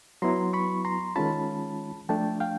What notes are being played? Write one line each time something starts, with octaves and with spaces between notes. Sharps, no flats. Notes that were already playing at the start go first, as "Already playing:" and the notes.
F#3 B3 E4 A#5 C6
B5 C#6
A#5 C6
D#3 G#3 C#4 F4 A5 B5
F3 A3 D4 G5 A5
F5 G5